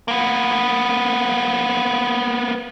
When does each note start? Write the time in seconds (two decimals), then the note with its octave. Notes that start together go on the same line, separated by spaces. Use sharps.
0.08 A#3 B3